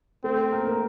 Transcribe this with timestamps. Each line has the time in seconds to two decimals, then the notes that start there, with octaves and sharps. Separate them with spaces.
0.24 A3 C4 A4
0.52 A#3 A#4
0.65 A#3 A#4